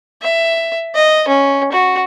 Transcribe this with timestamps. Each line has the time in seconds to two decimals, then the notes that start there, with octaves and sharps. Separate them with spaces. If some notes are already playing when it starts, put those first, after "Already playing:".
0.22 E5
0.95 D#5
1.28 C#4
1.72 F#4